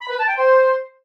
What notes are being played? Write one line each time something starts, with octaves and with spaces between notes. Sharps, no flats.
B5
B4
A5
G5
C5